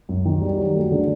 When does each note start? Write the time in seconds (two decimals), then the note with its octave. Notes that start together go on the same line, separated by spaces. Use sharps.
0.09 F#2
0.25 D#3
0.41 G3
0.58 F#3
0.75 A3
0.92 D3